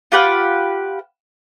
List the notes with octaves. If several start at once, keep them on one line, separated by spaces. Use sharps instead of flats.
F4 G4 B4 F#5